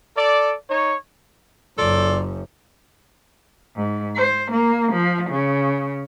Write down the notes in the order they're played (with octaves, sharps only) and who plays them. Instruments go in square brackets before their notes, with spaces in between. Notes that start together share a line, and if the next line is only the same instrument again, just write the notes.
[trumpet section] A4 D5
D#4 C#5
[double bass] F#1 F#2 [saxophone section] F4 A4 D5
[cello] G#2
C5
A#3
F3
C#3